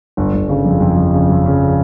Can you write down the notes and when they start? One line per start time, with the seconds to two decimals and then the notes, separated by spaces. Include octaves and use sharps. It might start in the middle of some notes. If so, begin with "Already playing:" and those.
0.17 G1
0.33 G1
0.49 C#3
0.65 F2
0.81 F2
0.97 F2
1.13 C#3
1.29 F2
1.46 C#3